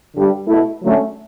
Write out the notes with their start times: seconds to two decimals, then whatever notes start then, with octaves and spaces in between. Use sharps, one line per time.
0.14 G2 D3 G3
0.48 B2 A3 E4
0.82 D3 F#3 A3 C#4